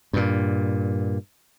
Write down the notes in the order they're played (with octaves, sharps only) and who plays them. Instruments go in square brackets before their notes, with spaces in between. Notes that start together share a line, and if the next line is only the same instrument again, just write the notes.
[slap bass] G2 A#2